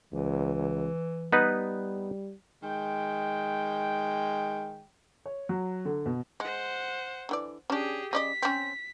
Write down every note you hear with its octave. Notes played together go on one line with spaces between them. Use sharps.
C#2 E3
G3 B3 D#4 B4
D#3 G#3 G5
C#5
F#3
D3
B2
G#3 C5 F#5
D3 E3 D5
C#4 D4 G4 G#4
C#3 D5 D#5 B6
C4 C#4